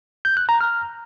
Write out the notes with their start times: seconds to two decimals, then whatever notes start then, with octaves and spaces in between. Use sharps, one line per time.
0.25 G6
0.37 F#6
0.49 A#5
0.61 F6